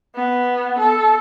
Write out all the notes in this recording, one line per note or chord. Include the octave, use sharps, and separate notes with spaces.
B3
A4